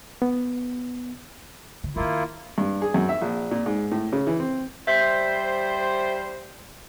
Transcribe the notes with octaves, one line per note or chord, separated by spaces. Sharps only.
B3
D3
D3 D#3 A#3 E4 F4
G2
G#4
F#2
E5
A#1
A#2
G#2
A2
C#3
E3
C4
G3 C5 E5 G6 B6